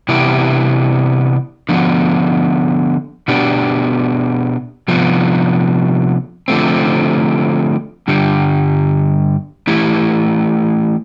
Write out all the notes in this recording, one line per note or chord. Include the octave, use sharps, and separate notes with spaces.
C3 E3 B3 E4 G4
D3 F3 B3
B2 B3 D4 G4
C3 F3 B3
D3 F3 A3 C4
G2 D3 G3
E3 A3 E4 G4